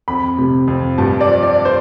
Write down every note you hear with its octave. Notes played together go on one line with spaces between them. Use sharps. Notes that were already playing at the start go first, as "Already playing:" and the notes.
F2 B5
C3
F2
G2 A5
D5
F3
D5
C5